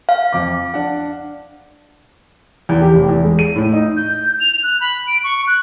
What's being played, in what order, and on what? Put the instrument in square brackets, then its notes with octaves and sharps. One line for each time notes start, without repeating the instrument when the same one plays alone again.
[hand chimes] F5
[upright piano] F2 D6
D4 F#5
[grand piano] E2
G4
F1
E2
G#3
D#7
A2
D#4
[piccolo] G6
F7
F#6
B5
D7
C#6
F#6